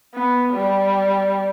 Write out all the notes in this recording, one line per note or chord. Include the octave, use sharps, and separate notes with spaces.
B3
G3